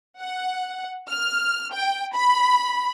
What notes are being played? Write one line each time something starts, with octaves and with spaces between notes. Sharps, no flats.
F#5
F6
G5
B5